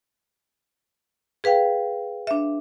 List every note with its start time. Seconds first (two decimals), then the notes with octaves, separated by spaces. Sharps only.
1.44 G#4 B4 F5 G5
2.27 D4 E5